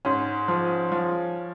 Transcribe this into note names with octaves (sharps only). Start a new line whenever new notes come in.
G#2 C#4
F3
F3